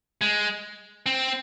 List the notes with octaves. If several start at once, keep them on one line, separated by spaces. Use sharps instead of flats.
G#3
C4